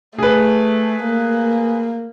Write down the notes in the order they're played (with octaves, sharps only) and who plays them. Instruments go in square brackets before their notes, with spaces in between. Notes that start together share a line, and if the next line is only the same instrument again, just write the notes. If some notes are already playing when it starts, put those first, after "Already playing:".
[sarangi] A3 [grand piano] G#4 B4
[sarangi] A#3